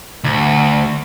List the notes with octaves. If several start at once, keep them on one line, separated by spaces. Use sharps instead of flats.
D2